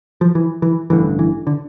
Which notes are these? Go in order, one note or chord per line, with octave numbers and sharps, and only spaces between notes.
F3
E3
E3
A1 G2 D3 E3
E3
D3